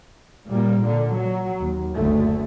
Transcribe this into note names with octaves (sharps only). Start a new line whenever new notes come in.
A#2 G3 A#3
A#2 D3
F#3
D#2
F#1 D2 A3